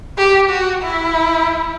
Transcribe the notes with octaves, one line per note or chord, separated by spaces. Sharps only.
G4
F#4
E4